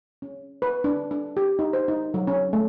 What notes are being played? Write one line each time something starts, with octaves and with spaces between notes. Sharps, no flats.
C#4
B4
D4
D4
G4
D#4
C5
D#4
F#3
C#4
A3